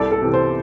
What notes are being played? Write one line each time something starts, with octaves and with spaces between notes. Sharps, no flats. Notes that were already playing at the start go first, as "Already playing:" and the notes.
Already playing: C2 A4 D5
A4
C3 E3
C5